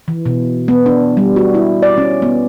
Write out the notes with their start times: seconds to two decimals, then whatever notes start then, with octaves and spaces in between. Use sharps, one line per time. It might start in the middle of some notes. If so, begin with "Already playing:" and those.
0.08 E3
0.26 B2
0.68 B3
0.86 D4
1.17 G3
1.36 F#4
1.54 E4
1.82 D5
1.98 C#4
2.22 B3